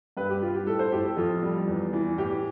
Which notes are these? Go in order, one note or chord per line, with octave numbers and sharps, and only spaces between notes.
G2 B4
G4
G3 F4
G4
A2 A4
C5
A2 G4
A4
F2 F4
G3
E2
E3
A2 G4